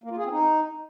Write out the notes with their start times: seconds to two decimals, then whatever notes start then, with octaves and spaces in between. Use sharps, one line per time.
0.04 A#3
0.10 F4
0.17 G#4
0.24 C4
0.31 D#4